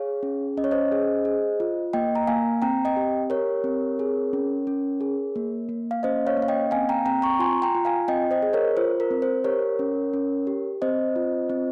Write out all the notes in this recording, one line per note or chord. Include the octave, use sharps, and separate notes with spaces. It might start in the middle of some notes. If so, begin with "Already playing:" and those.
Already playing: G#4 C#5 F5
C#4
C#4 D#5
C#5
C5 D#5
G#4
G#4
F4
A#3 D#5 G5
A#5
A#3 F5 G#5
C4 G5 A#5
D#5 G5
G4
G4 A#4 C#5
C4
G#4
C#4
C#4
G#4
A#3
A#3
F5
C#4 C5 D#5
C#5 F5
A#3
F5
D#5 G5
C4 F5 G#5
G5 A#5
C4 G5 A#5
A#5 C#6
F4 G#5 C6
G5 A#5
F4
F5 G#5
C4 D#5 G5
C5 D#5
G#4
A#4 C#5
F4 C5
A#4
C4
C5
G4 A#4 C#5
C#4
C#4
G4
C4 C5 D#5
F4
C4